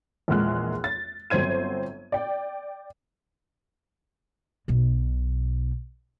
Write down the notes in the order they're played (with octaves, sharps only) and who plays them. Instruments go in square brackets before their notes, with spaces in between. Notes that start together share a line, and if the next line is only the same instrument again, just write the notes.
[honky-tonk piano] A#1 E2 A#2 G#3 F6 F#6
A6
G1 F#3 C4 C5 G#6 D#7
D5 G5
[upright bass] B1 B2